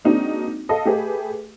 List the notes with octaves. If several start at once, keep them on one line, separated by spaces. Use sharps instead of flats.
G#3 A#3 C4 D4 D#4 F#4
A4 D#5 F5
A3 G4 G#4 B4